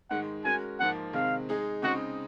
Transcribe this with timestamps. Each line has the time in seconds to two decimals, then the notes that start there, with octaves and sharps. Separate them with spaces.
0.10 G#2 D#3 G#3 F#5
0.45 G#3 C#4 F#4 A#4 G#5
0.80 G#2 F3 A#3 F#5
1.13 C3 D#3 G#3 C4 F5
1.49 G#3 D#4 G#4
1.83 C#3 G#3 C4 D#4 F#4